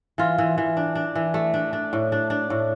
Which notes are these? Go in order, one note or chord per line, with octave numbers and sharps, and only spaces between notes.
E3 F4
E3
E3
D4
D4
E3
A3
D4
D4
A2
D4
D4
A2